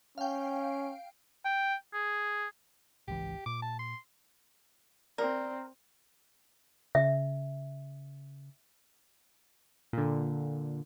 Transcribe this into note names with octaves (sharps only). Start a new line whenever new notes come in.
C#4 F5 G5
G5
G#4
G#1 C#2 E3 G4
A#2 D6
A5
C6
C4 A#4 D5
C#3 E5
A#2 D3